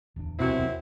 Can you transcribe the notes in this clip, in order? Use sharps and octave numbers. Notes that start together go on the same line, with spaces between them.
D1 E2 D4
B1 F#2 C3 C4 E4 F#4
D#2